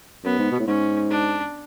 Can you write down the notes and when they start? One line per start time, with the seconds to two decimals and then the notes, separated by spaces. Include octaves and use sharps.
0.24 F#2 B3
0.38 G#2
0.51 B2
0.60 A2
0.67 G#2 C#4
1.11 D4